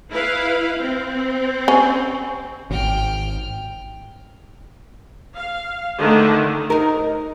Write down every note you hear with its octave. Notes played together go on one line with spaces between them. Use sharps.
E4 B4 F5
C4
C#4
G#1 G5 F6
F5
D3 D#3 A3
D#4 A#4